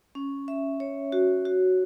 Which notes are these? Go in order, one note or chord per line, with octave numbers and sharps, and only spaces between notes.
C#4
E5
C#5
F#4
F#4